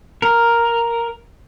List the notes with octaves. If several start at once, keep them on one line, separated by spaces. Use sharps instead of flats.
A#4